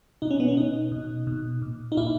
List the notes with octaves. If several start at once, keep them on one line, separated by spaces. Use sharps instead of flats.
B2 D#4
C#4
B3
C#4
B2 D#4
B2
B2
A#2
D#4
A#2 E4